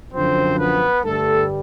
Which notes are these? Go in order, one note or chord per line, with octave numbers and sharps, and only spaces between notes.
F#2 D3 F3 C4 C5
B3 B4
G2 D3 G3 A3 A4